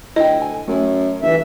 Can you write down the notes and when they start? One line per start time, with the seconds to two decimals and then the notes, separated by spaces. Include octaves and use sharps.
0.16 D2 E4 D#5 G5
0.42 G#5
0.68 F#2 A3
1.22 G1 E3 E5